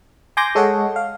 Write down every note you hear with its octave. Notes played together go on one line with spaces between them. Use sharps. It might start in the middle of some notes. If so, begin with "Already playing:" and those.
G#5 C6 D6 G6 A#6
G#3 A4 C#5 D#5 F#5
F5